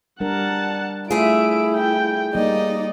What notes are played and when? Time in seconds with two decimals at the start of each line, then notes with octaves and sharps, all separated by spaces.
0.20 G3 D4 A#4 F#5 A5
1.11 A3 E4 F4 G#4 E5 D7
1.76 G5
2.35 G3 A#3 D#4 D5 D#5